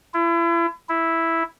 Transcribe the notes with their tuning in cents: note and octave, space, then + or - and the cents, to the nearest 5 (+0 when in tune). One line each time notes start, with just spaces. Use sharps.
E4 +35
E4 +0